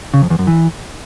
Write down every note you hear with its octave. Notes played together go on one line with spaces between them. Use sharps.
C#3
F2
E2
F#2
E3